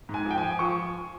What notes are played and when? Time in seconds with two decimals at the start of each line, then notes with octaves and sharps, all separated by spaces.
0.09 G#2
0.14 G#5
0.25 F3 G5
0.38 G#5
0.43 F3
0.59 F3 C#6